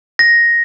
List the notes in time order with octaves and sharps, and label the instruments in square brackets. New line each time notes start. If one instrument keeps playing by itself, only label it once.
[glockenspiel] A#6